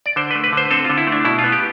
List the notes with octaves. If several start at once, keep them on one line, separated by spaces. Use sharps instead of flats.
D5
D3 C5
B4
A3
B4
D3 C5
C4 A4
D3 F4
E4
A3
D4
B2 E4
B3 F4
G4